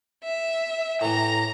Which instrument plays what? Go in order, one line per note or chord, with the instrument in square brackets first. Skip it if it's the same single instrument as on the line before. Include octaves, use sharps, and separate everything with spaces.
[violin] E5
[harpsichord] A2 E3 [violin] A#5